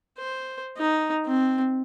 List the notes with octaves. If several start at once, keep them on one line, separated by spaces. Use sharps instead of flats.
C5
D#4
C4